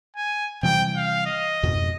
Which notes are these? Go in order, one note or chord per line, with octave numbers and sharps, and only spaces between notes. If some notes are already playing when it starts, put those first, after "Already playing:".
G#5
C3 E3 G3 G5
F5
D#5
F2 G#2 B2